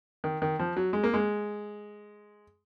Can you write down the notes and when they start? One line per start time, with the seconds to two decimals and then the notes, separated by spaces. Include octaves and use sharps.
0.24 D#3
0.42 D#3
0.59 F3
0.76 F#3
0.93 G#3
1.04 A#3
1.14 G#3